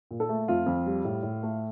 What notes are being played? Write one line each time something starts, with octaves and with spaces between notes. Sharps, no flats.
A#2
A4
A3
F2 F4
F2
G3
A2
A2
A3